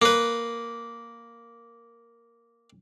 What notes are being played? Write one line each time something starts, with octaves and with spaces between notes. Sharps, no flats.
A#3 B4